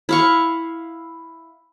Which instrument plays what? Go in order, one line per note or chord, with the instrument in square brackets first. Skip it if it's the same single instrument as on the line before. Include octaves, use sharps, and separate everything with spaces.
[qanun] E4 F5 C#6